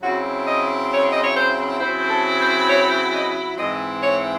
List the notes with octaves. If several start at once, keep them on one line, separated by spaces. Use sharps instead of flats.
C#3 F#3 C4 E4 F#4
D#5
C#5
D#5
C#5
C5
C#3 F#3 C4 E4 C5
C5
A4
C5
C#5
D#5
G#2 E3 C4 E4 D#5
C#5